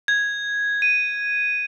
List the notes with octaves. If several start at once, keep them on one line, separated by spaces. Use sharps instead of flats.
G#6
D#7